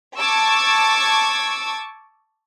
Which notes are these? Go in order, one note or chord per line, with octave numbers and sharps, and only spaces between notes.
A5 C#6 D6 E6 G#6